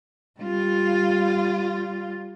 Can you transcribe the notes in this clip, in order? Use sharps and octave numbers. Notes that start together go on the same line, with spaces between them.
G3 F4